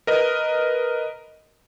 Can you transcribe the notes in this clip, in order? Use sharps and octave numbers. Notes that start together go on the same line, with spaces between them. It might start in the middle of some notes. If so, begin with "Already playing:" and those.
A#4 B4 D#5